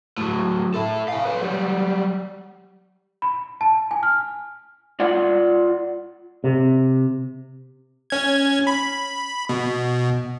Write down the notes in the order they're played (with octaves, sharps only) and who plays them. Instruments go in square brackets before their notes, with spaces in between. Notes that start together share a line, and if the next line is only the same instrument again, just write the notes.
[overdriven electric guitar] A2 F#3
E4 A4
F5 G#5
B4 C#5
F#3 G3
[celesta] B5
A5
G#5
F6
[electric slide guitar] F4 D5 F#5
[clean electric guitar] C3
[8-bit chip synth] C#4 G#6
B5
B2